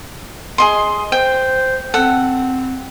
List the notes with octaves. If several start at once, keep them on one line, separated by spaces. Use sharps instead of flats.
G#4 D#5 C6
C5 G5
C4 A4 F#5